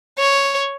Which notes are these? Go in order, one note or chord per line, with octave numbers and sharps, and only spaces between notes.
C#5